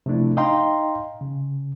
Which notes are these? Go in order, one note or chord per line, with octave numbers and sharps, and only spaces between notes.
C3 F3 A3 D4 E4
D#4 D#5 F5 G5 A#5 C6
C#3